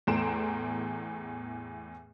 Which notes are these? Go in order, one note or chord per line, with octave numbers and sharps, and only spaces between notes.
E2 A2 A#5 C6 D7 E7